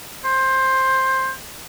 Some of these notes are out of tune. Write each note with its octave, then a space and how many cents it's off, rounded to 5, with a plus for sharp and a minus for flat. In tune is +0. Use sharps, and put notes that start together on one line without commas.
C5 +15